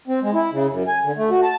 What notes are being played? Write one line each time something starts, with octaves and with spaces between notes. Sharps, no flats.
C4
G#3
E4
C#3
F#2
G#5
D3
A3
F#4
A5